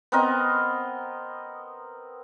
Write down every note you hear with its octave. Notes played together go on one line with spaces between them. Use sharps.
B3 C4 A#4 D#5